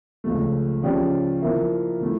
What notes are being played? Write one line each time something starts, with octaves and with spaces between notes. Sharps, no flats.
C#2 C#3 F3 A3
C#3 F3 C#4 G4 D5
F3 A#3 E4 A#4 E5
F3 A3 E4